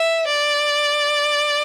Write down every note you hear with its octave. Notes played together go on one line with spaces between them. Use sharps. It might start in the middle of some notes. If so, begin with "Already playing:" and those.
Already playing: E5
D5